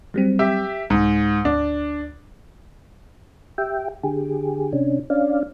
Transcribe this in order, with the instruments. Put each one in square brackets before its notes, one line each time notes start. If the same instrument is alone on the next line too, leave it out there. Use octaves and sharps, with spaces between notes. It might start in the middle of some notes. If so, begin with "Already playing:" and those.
[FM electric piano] F#3 G3 C4
[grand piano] G4 E5
[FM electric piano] C2 [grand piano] G#2
[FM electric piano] D2 [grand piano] D4
[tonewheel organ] G4 E5 G5
D3 G4 G#4
C3 C#4 D4
C#4 D4 D5 F5